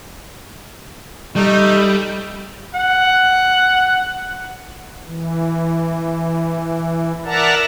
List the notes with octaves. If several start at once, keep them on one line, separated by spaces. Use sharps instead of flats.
G3 A3 D#4
F#5
E3
A#4 D5 E5 F#5 A5 A#5